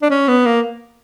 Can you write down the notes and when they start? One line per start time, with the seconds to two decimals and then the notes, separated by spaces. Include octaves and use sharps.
0.02 D4
0.10 C#4
0.28 B3
0.46 A#3